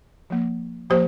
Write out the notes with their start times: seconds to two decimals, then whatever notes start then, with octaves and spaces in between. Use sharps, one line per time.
0.30 F3 A#3
0.90 F3 A#3 G4 C5